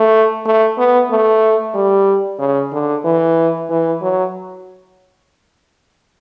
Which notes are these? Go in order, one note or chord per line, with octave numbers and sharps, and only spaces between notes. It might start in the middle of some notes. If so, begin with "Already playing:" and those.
Already playing: A3
A3
B3
A3
G3
C#3
D3
E3
E3
F#3